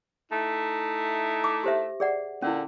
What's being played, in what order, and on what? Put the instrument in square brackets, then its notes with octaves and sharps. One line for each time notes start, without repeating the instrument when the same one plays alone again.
[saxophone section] A3 D#4 E4
[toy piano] D6
G4 C5 E5
G#4 D5 F#5
[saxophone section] A#2 D3 [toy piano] C#4 E4